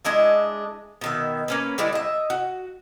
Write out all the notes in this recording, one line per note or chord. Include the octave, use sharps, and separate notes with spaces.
G#3 D4 E4 D#5
B2 D#3 E5
A#3 C#4 B4
D3 G3 G#3 E4
D#5 E5
F#4